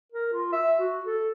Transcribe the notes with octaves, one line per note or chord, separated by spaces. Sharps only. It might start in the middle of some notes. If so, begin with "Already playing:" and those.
A#4
F4
E5
F#4
A4